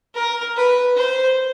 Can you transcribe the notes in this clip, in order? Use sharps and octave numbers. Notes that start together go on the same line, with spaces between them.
A#4
B4
C5